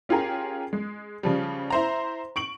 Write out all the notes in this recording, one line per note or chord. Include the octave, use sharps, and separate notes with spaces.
C#4 F4 G4 G#4 A#4
G#3
C#3 F3 G3
E4 C5 A#5
C#6 D7 F#7